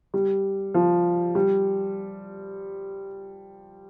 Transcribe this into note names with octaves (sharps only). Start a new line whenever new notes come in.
G3
F3
G3